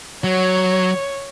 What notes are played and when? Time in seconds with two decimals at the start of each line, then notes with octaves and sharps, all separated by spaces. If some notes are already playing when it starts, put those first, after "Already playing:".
0.24 F#3 C#5